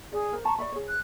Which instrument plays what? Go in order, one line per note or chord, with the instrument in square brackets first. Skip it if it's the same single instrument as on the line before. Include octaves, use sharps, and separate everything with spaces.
[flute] G#4 [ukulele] D5
[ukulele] A#4 C5
[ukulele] A5 A#5 [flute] C#6
[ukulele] D5 E5 B5 [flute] C#6
[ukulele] G#4 C#5
[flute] F#6